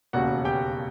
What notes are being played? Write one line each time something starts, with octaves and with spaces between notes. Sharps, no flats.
E1 D#2 C#3 F#4 F#5
G4 G5